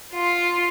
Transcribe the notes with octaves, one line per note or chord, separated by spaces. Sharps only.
F4